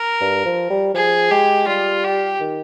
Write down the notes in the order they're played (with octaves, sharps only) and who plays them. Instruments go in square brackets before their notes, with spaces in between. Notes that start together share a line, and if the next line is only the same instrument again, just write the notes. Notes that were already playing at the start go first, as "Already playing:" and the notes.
Already playing: [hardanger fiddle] A#4
[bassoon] G2
F3
G3
[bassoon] F3 [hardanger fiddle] G#4
[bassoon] G#3 [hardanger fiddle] G4
[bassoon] G3 [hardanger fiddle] F4
[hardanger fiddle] G4
[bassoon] D#3